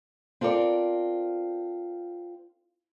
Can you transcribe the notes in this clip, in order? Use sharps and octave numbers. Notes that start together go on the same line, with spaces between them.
C4 F4 A4 A#4 D5